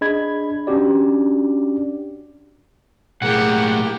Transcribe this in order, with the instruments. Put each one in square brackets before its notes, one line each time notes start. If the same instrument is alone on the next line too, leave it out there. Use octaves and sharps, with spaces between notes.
[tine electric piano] D4 G#4 D#5 B5 G#6
C#4 D4 F#4 G4 D5
[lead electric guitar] B1 A2 [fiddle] A#3 G4 [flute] G#4 [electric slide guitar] F#5